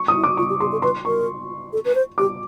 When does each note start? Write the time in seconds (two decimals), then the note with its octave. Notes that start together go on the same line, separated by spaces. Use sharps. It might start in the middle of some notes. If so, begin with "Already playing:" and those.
Already playing: C#6
0.08 F4 D#6
0.16 E4
0.24 D6
0.37 F4 C#6
0.49 G4
0.60 G#4 C6
0.72 A4
0.82 B4 C6
1.05 A#4 C#6
1.73 A4
1.85 B4
1.95 C5
2.18 G4 D6